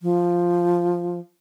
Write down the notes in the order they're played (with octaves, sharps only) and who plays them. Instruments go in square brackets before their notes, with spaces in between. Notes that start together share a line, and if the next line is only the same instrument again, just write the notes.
[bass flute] F3